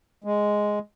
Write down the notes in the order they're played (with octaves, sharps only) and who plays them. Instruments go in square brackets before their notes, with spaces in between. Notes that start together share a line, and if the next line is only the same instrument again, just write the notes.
[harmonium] G#3